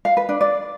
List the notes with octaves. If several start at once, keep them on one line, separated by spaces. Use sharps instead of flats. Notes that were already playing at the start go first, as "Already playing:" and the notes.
F5
B4
D4
D5